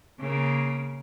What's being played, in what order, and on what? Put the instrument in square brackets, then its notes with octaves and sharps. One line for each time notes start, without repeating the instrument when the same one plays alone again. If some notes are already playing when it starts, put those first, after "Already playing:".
[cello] C#3 A#3